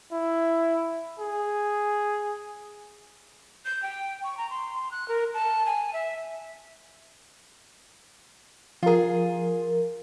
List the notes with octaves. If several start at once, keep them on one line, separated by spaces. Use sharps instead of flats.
E4
G#4
G6
G5
C#6
A#5
C6
F#6
A#4
A5
G#5
E5
F3 F4 G#4 A#4